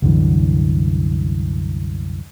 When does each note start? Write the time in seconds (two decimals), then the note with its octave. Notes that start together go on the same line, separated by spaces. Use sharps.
0.02 C2 F#2 D3 E3